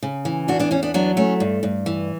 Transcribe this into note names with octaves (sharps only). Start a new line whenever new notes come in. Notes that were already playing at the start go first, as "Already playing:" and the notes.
C#3
E3
E2 D4 F#4
B3 D4
E2 C#4
B3 D4
F#3 B3 D4
A3 C#4
G2
G2
E3